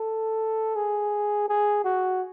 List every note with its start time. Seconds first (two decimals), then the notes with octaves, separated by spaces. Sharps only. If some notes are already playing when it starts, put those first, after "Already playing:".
Already playing: A4
0.76 G#4
1.49 G#4
1.85 F#4